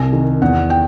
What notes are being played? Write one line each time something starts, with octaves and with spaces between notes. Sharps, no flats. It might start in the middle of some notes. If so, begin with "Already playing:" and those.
Already playing: C2 G#5
D#3
E2 F#5
G5